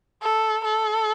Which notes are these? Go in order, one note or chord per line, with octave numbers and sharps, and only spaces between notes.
A4
A4